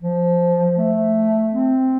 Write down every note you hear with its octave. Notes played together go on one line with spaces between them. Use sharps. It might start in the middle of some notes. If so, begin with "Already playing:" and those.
F3
A3
C4